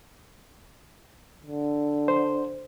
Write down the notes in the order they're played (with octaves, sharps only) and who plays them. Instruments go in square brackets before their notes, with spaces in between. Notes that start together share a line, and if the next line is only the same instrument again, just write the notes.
[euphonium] D3
[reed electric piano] C5